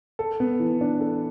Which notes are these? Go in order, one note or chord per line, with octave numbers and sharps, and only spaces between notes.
A4
B3
E3
D4
A4